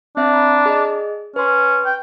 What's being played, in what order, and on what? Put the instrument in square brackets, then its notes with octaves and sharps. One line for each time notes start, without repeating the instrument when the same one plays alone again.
[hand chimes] C4 E5 [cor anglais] D4
[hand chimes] A#5 B5
G#4 D5 D#5
[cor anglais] C#4 [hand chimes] B4 C6
[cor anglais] G5